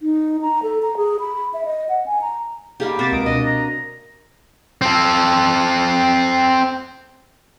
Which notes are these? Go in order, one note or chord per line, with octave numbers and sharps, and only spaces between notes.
D#4
A#5
A4
A#5
G#4
B5
E5
D#5
F#5
G#5
A#5
G3 A#3 D#4 G4 G#4 F5
C3 F#4 A#4 C5 D6 A6 B6
C#2 D#6 D7
B2 D4 D#5
A#5
C4 A4